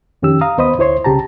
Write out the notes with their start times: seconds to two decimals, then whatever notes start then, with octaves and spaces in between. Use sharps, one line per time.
0.22 F2 D#3 C#4 G4 E6
0.41 F5 A#5 D#6
0.58 D#2 B3 C5 D#5 B5 D#6
0.78 D2 E4 C5 C#5 C6
1.05 C2 C#3 G4 A5 A#5